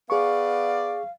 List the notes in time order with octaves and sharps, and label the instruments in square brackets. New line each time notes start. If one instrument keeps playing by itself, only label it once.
[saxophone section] B3 D5 [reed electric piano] G#4 C#6 [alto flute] F5